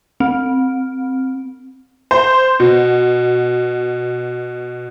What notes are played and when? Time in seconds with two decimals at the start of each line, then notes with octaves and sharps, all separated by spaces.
0.20 C4
2.11 C5
2.60 B2